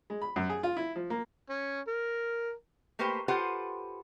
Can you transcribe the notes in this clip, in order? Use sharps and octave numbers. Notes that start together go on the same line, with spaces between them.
G#3
B5
F#2
G#4
F4
E4
F3
A#3
C#4
A#4
A3 A#3 G4 B4 C5 G5
F4 G4 A4 B4 C5 F#5